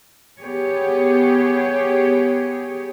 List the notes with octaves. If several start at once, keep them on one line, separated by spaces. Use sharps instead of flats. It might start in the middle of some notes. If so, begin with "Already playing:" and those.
B3 G4 G#4 C#5